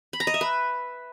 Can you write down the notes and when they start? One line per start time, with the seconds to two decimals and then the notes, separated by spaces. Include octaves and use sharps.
0.13 B5
0.20 A#5
0.27 D#5
0.34 E5
0.41 B4